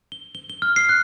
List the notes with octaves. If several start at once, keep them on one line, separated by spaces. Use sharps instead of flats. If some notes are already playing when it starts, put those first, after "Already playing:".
G7
G7
G7
F6
C7
F#6